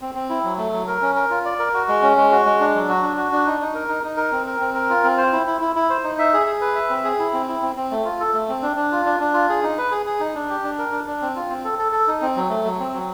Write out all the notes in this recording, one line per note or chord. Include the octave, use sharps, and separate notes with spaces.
C4
C4
E4
F#3
A3
F#3
A#4
C#4
A#4
F4
D5
A#4
F#4
G#3
C#4
G#3
F#4
G#3
D4
F#3
F#4
D4
F#4
D4
D#4
D#4
A#4
D#4
D#4
A#4
C4
A#4
C4
A#4
F4
C4
C5
E4
E4
E4
E4
C5
D#4
E5
G#4
G#4
B4
E5
C4
G#4
E4
C4
E4
C4
C4
A3
F4
A4
A3
C4
D4
D4
F4
D4
D4
F4
G#4
D#4
B4
G#4
G#4
D#4
D4
G4
D4
A#4
D4
D4
C4
F4
C4
A4
A4
A4
D#4
C4
F#3
A3
F#3
C4
F#3